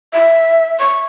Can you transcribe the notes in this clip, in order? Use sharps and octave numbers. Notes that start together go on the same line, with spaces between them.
E5
C#6